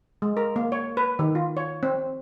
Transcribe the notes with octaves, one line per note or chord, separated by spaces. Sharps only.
G#3
A#4
A#3
C#5
B4
D#3
F4
C#5
C4